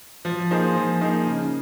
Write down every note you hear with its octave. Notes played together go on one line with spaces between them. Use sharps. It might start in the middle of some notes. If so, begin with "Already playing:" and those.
F3
A#3 D#4 G#4 C5
F3
A#3 D#4 G#4 C5
C#3